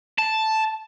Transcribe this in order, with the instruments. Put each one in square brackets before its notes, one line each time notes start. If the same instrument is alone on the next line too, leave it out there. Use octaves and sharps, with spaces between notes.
[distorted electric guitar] A5